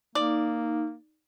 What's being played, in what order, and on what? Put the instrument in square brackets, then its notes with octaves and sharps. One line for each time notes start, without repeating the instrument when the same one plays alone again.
[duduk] A#3 [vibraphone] D#4 [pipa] D5